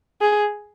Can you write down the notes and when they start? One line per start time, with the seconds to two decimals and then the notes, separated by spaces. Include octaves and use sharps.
0.21 G#4